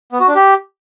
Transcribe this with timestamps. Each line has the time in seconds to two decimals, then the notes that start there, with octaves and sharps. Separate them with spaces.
0.12 B3
0.20 F#4
0.28 D4
0.35 G4